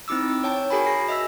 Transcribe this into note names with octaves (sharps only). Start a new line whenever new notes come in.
C4 D#4 E4 D6 E6
C#5 G5 A5
F#4 G#4 A#4 G#5 B5
A#6 C7
D#5 E5 E6